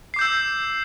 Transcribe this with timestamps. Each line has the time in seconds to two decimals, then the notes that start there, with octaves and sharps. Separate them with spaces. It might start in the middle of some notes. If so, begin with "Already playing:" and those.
0.14 C7
0.16 D6
0.19 G6
0.21 E6